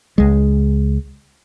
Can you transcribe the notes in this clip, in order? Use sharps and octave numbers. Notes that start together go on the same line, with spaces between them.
C#2 G#3